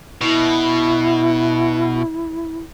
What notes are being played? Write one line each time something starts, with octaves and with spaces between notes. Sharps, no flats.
B2 E4